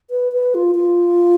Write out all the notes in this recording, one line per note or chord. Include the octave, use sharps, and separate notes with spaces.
B4
B4
F4
F4